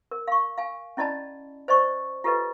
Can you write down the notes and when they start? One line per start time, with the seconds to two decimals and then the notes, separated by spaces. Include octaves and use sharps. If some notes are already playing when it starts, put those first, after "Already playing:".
0.11 A#4
0.28 F5 C#6
0.58 F5 G#5
0.97 C#4 E4 D5 D#5 A5 B5
1.68 C5 D5 D#5 C#6
2.24 F4 G4 A4 B4 D#5